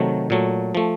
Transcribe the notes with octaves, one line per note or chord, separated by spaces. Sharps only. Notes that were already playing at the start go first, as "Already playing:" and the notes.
Already playing: C3 D#3 F#3 A3
A#2 F#3 A3
F3 A3